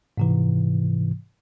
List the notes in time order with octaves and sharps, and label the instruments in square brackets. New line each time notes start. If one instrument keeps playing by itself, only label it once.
[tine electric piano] G#2 C3 E3